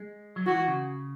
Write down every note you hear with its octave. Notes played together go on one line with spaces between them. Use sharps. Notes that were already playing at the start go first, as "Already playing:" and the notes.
Already playing: G#3
F#3
E3 F#4
C#3